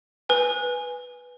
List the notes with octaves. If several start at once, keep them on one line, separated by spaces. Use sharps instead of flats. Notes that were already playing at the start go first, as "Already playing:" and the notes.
B4 G#5